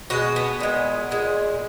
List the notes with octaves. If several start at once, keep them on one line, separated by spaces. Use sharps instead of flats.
B2 G#3 F#4
B3
A#2 G#3
A#2 G#3